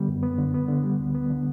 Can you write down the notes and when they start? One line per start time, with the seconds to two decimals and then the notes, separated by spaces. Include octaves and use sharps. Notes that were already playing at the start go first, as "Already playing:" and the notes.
Already playing: D3 G3 B3
0.08 F#2
0.23 B3
0.38 D3
0.54 B3
0.68 D3
0.84 G3
0.99 D2
1.15 B3
1.30 D3